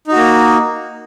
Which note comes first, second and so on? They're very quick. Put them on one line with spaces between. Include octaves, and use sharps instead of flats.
D#4 F#4 A#3